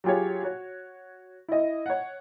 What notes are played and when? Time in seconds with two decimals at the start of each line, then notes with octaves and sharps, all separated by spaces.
0.04 F#3 F4 G4 G#4 C#5
0.43 F#4 C#5
1.48 E4 D#5
1.86 C#5 F#5